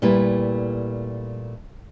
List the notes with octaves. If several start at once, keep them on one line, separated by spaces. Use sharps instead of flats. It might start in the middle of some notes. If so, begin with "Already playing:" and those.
A#2 G3 A3 E4 B4